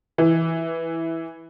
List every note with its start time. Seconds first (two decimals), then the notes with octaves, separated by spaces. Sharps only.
0.18 E3